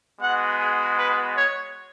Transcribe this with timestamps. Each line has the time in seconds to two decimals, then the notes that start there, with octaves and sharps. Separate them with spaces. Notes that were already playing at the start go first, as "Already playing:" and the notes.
0.20 G#3 B3 F#4 F#5
0.58 G#4
0.96 B4
1.34 C#5